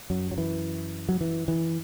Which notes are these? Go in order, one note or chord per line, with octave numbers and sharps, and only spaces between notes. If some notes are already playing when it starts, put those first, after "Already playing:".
F#2 F#3
F#3
E3
F#3
E3
E3